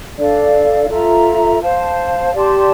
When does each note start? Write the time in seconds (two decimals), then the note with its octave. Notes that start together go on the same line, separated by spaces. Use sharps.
0.17 D4 A4 D5 F5
0.89 F4 A4 E5 A#5
1.61 C5 F5 A5
2.34 G4 D5 A5 C6